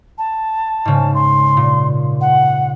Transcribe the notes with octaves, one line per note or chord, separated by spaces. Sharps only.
A5
G#2 C#3
C6
A#2
F#5